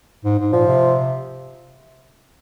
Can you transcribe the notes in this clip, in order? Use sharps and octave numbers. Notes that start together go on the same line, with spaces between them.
G#2
G#2
A#2 F3
C3